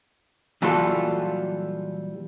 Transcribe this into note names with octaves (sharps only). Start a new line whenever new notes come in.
A#2 E3 F#3 G3 F4 A4